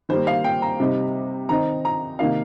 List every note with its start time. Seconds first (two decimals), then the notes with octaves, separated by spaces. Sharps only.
0.09 D#3 G3 A#3 C5
0.27 F5
0.44 G5
0.62 A#5
0.80 C3 G3 C4 D#4
1.49 D#3 C4 D#4 A#5
1.85 A#5
2.19 C3 D#3 A#3 D#4 F5